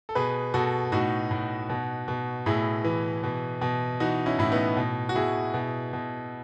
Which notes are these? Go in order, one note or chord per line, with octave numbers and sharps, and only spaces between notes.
A4
B2 G#4 B4
B2 F#4 A4
A2 D#4 F#4
A2
B2
B2
A2 E4 G#4
E3
B2
B2
E3 D#4 F#4
C#4 E4
A2 E4
B3 D#4
B2
F#4
B2 E4 G#4
B2
B2